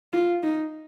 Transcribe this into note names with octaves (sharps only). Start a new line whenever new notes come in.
F4
D#4